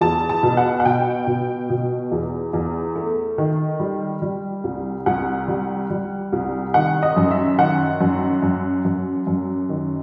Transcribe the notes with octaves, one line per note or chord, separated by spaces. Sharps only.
E2 A5
A5
B2
F#5
F#5
B2 G5
B2
B2
E2
E2
A3
D#3
G3
G3
C2
C2 F#5
G3
G3
C2
D#3 F#5
D#5
F#2
E5
D#3 F#5
F#2
F#2
F#2
F#2
D#3